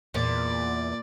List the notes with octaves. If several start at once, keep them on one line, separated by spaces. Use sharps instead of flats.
E2 A#2 D5